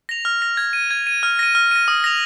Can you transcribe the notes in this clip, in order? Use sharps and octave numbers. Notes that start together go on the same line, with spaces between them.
A#6 F7
F6
A#6 F7
G#6
D#7
G#6
D#7
F6
A#6 D#7
F6
A#6 D#7
D#6
A#6 F7